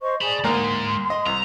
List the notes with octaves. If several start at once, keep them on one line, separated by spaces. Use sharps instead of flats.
C5 D#5 C#6
G#4 D5 A5 B5
D2 G#3 A#3 D#4 A#5 C6
D#5
C2 A#5